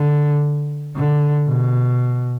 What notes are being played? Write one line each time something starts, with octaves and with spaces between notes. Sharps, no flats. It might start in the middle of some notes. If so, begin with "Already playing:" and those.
Already playing: D3
D3
B2